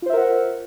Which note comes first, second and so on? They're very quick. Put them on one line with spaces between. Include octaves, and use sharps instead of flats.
F4 C5 E5 A#4 F#5